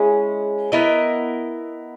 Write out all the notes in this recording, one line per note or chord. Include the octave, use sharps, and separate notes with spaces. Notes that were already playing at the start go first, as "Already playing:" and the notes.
Already playing: G#3 C#4 E4 G#4
B3 E4 A#4 D#5